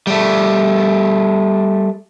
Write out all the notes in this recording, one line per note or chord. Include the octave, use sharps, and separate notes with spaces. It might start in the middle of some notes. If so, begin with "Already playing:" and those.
G3 A3